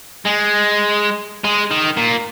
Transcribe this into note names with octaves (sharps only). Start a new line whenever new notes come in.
G#3
G#3
D#3
A#2